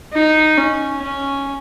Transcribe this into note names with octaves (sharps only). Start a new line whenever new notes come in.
D#4
C#4
C#4